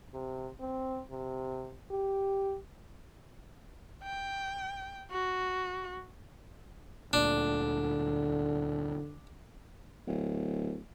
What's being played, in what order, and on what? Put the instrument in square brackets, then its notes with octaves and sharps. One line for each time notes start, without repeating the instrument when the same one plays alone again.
[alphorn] C3
C4
C3
G4
[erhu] G5
F#4
[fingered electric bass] D2 A#2 [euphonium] D3 [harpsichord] D4
[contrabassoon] D1